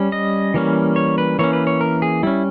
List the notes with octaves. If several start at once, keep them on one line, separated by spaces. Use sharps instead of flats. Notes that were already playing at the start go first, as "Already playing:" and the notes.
Already playing: G3 C#4
D#5
E3 G3 A#3 C#4
C#5
B4
E3 A#3 C#4 C#5
B4
C#5
A#4
G#4
G3 C#4 E4